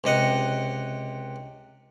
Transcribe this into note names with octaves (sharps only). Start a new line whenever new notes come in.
C#2 C3 D#5 F#5